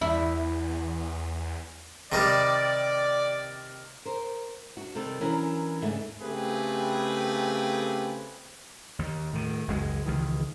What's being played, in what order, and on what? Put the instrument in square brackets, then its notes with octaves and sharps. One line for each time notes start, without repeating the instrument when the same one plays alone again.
[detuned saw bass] E2 [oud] E4
[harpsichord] C3 D#3 G3 [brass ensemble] D5
[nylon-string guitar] A#4 C5
D4 F#4
C3 D#3 G3 A4
E3 F#3 C#4 D4 A#4
D#2 G#2 C#3 A3 B3 D4
[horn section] C#3 A3 C4 G4 G#4 B4
[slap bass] D#2
A2 D#3
F#1 C#2 G#3
C#2 D#3 E3